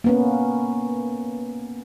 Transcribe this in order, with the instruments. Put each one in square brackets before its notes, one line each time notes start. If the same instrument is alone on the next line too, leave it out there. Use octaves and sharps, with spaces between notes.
[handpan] A#3 B3 C#4